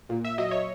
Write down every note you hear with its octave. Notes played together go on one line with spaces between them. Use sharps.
A#2
E5
F#3 D#5
C#5